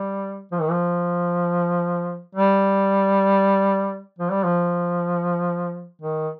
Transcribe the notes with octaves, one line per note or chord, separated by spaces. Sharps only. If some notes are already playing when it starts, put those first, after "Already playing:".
Already playing: G3
F3
D#3
F3
G3
F3
G3
F3
D#3